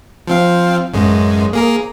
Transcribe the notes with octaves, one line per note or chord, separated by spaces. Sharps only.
F3 C4 F5
A1 F#2 G#3
A#3 G#4 A#4